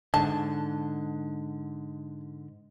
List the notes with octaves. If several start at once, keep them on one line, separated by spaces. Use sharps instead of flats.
G#2 D3 A5